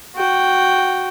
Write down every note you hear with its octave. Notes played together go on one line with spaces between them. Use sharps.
F#4 G5